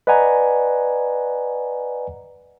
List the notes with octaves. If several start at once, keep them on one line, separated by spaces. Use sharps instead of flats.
B4 D5 D#5 F#5 G#5 A#5